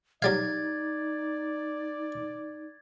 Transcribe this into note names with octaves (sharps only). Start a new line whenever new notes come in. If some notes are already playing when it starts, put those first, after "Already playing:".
F#3 G3 D#4 D5 F5 G#6 A6